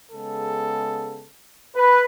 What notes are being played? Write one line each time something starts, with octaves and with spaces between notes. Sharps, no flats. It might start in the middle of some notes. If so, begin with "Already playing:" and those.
C#3 G#3 B3 A4
B4